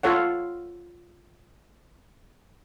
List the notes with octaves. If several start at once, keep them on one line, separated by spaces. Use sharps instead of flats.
F4 A4 C#5 F#5